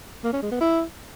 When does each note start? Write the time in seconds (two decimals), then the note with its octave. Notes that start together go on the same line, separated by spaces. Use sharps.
0.24 A#3
0.33 C#4
0.42 G#3
0.52 B3
0.61 E4